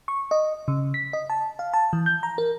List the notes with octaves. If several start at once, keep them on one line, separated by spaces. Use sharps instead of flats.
C#6
D#5
C#3
B6
D#5
A5
F5
A5
E3
G6
A#5
A#4